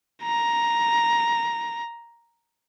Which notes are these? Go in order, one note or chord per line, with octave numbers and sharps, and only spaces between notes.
A#5